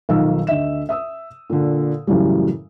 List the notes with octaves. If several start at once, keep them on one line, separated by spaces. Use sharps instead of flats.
B1 D#3 F3 F5 E6
D2 D#5 E5 E7
E5 D#6 E6
A#2 D3
F#2 A2 C#3 E3 F#3 G3